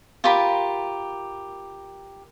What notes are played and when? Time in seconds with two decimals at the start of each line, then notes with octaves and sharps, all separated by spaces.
0.24 F4 G4 A#4 B5